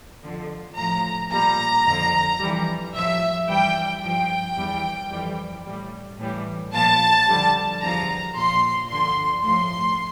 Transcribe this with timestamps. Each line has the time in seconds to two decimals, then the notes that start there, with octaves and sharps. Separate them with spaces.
0.23 F2 D3 F3
0.77 A2 F3 A#5
1.31 A#2 G3 A#5
1.85 F2 D3 F3
2.40 F2 E3 G3
2.93 A2 F3 E5
3.48 G2 E3 G3 G5
4.01 G2 F3 G5
4.56 E2 E3 G3
5.11 F2 E3 G3
5.65 A2 G3
6.19 A2 E3 G3
6.73 A#2 F3 A5
7.27 F2 D3 G3
7.81 E2 D3 F3 A#5
8.35 A#2 F3 C6
8.89 G2 D3 F3 C6
9.43 A2 F3 C6